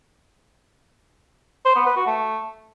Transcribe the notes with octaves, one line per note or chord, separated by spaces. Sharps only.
C5
B3
B4
F#4
A3